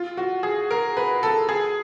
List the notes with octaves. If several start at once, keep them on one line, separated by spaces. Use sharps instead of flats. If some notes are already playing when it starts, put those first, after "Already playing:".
Already playing: F4
F#4
G#4
A#4
B4
A4
G#4